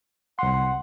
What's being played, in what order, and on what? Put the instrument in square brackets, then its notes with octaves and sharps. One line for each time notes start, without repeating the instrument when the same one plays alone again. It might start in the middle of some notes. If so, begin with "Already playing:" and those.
[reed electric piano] C2 C6 [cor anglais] F#5